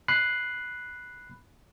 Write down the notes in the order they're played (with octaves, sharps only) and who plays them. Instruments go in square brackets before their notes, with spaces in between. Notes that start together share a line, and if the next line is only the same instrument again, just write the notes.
[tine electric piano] B5 F#6 C7